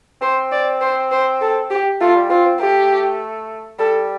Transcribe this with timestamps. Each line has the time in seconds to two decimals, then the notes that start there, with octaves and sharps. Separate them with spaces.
0.21 C4 C5
0.52 D5
0.81 C5
1.11 C5
1.41 A4
1.70 G4
2.00 A3 F4
2.15 G3
2.30 C4 F4
2.45 C4
2.60 A3 G4
3.79 G3 A4